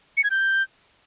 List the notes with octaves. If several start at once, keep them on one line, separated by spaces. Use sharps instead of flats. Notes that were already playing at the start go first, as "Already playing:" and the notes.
C#7
G#6
G6